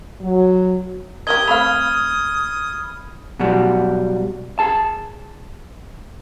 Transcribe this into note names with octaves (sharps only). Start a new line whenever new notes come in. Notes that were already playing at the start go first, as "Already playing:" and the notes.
F#3
G4 A#4 D#5 D#6 G#6 G7
A3 C4 F5 B5 F6
B2 F#3 G3
G#4 A5